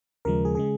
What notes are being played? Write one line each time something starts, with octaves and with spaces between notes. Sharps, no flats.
D#2 C#3 F3 G#3 A#4
G#4
C#3 G#3 G#4